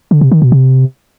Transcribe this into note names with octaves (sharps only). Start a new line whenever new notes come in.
D3
C3
D#3
B2
C3